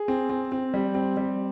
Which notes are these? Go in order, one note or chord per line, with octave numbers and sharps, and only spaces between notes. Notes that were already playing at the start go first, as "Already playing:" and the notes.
Already playing: G#4
C4
C4
C4
G3
C4
G3